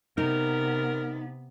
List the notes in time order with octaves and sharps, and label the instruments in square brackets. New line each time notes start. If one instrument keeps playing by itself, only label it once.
[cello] C3 B3 [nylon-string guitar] D#4 [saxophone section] A#4